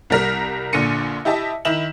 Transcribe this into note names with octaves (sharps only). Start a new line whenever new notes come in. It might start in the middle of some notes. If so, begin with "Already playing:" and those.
C2 G3 A#4 F6
A#1 A#2 D3 A#6 C#7 D#7
E4 G4 D#5 E5 A5
D#3 E4 E7 F#7